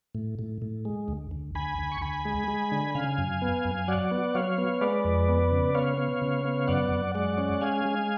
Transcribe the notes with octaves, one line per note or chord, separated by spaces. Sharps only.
A2
A2
A2
G#3
D2
D2
D2 G#5 B5
D2
C#6
D2 G#5 B5
G#3
G#3
D3
C#3 F5 G#5
F#2
B3
F#2
F#3 D5 F#5
B3
F#3 C#5 F5
B3
G#3 B4 D5
F2
B3
C#3
B3 C#5 F5
B3
C#3
B3
F#2 D5 F#5
F#2
G#3 D5 F#5
C#4
G#3 F5 G#5
G#3